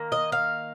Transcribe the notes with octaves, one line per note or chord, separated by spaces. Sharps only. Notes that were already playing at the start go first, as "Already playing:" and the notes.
Already playing: D#3 A#3
D#5
F5